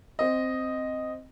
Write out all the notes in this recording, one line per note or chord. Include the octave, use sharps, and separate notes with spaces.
C4 D#5